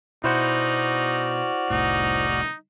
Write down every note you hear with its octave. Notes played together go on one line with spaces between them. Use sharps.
B2 D#4 E4 F#4 C5 D5 F#5 F6
F1 C2 A2 D#4